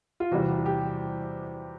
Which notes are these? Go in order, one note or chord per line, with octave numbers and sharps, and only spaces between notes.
F4
E2 C3 E3 G3 F#4
G4